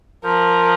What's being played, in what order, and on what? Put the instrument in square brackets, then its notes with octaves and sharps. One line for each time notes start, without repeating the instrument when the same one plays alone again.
[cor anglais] F3 [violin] A#4